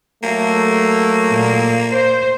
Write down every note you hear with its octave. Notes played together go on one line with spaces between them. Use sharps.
F#3 A3 A#3
A#2
C5